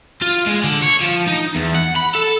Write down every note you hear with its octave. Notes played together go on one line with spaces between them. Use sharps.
F4
G#3
D3
C#5
F3
D#4
E2
F#5
B5
A4